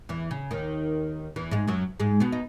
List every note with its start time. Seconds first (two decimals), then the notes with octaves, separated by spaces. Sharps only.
0.09 E2 E3
0.31 C#3
0.51 D#2 D#3
1.36 E2 E3
1.51 G#2 G#3
1.68 F#2 F#3
2.00 G#2 G#3
2.20 B2 B3
2.32 D#4